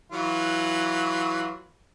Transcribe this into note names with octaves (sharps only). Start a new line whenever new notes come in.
E3 F#3 F4